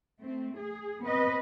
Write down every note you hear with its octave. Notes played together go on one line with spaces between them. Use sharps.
A3 C4
G#4
B3 C4 B4 D#5